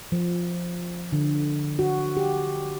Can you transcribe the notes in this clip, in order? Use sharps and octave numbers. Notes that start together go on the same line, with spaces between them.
F3
D3
F#4
G4